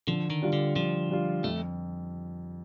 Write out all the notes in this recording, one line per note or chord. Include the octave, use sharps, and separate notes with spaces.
D3 F3
D#3
G3 D4 F4
D3
D3 F3
G3 D4 F4
F2 A3